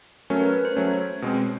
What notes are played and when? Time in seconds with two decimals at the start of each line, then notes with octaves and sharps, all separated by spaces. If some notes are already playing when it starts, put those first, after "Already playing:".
0.30 F#3 A3 C#4 A#4
0.41 B4
0.53 B4
0.65 C5
0.76 F#3 A3 C#4 C#5
1.22 B2 G#3 C4